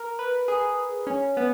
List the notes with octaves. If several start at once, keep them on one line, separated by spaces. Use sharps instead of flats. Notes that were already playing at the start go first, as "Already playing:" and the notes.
Already playing: A#4
B4
G#4
C#4
B3